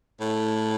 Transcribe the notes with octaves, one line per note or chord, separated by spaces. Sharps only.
A2